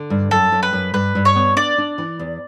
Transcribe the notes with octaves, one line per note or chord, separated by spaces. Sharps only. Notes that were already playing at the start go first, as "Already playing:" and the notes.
Already playing: D3
G2
F#2 A4
F#2
B4
F#2
G2 B4
G2
C#5
B3
D4 D5
D4
E3
E2